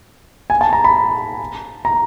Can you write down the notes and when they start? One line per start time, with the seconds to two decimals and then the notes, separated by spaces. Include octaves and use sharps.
0.50 G#5
0.61 A5
0.73 A#5
0.84 B5
1.85 A#5